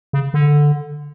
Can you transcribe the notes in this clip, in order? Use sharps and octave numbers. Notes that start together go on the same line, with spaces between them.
C#3
D3